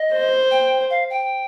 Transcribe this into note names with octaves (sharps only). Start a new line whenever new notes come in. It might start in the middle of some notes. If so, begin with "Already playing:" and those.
Already playing: D#5
C5
G5
F5
G5